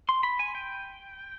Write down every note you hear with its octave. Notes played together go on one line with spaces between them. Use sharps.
C6
B5
G#5
G5